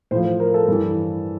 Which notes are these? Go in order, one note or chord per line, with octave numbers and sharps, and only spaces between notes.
A2 F3 C5
C5
A#4
A4
G2 E3